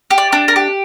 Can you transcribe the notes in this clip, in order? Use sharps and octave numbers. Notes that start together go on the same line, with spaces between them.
G4
D5
D4
A#4
G4